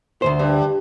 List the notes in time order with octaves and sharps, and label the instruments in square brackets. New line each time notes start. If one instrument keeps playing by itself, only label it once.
[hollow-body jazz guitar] D2 B2 C5
[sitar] G2